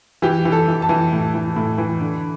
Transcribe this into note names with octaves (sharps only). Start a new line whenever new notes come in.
E3 G4
E3
A4
E3
A5
E3
A2
E3
A2
E3
D3